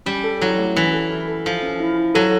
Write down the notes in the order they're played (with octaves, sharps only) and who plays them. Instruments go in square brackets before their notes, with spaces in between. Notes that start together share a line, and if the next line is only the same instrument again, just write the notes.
[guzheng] G3 [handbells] C#4
[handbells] A4
[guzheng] F#3 [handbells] E4
[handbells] A3
[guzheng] E3 [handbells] C#4
[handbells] A4
E4
A4
[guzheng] F3 [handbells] A4
[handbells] C#4
E4
E4
[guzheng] F#3 [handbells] A4